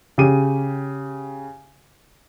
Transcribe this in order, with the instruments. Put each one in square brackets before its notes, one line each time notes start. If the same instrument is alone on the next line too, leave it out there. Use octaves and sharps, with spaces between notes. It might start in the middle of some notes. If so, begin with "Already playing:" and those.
[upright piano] C#3 G4 D#7